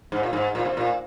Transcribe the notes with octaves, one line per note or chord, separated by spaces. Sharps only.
G#2
A#2
G#2
A#2
C3
A#2